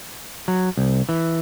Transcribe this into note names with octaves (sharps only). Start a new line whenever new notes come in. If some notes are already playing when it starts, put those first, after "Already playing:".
F#3
C2
E3